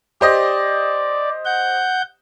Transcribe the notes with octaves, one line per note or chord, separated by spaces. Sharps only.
G4 C5 D5 D#5
F#5 G6